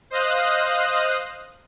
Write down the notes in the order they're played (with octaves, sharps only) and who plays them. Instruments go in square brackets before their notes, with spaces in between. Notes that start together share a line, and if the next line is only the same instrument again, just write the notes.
[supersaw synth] C5 D#5 F5 D#6 F#6